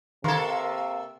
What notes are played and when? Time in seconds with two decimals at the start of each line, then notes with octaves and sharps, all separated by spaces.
0.24 C3 D#3 A#3 A4 A#4 C6 C#6 G#6